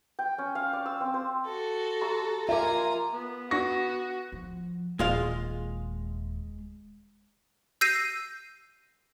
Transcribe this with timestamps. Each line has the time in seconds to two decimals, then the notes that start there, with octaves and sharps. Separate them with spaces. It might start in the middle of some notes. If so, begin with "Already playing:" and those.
0.19 G5
0.38 C#4
0.55 F5
0.73 D5
0.86 E6
1.01 C4
1.14 C5
1.45 F#4 A4
2.01 G4 A#5 C6
2.49 F4 A#4 E5 F5 G#5 A#5 D6
3.13 B3
3.51 D4 F#4 C#6 A#6
4.32 F3
4.99 D#1 G#3 F4 F5
7.81 E6 G6 A#6 C7 D#7